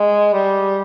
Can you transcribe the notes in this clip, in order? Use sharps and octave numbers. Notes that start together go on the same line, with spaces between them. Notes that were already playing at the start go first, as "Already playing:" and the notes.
Already playing: G#3
G3